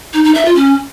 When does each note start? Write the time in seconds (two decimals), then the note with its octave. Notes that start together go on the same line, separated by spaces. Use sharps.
0.13 D#4
0.24 D#4
0.35 E5
0.45 F4
0.56 C#4